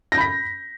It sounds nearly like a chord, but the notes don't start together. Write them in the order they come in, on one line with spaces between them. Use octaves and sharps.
A#6 G6 B5 B6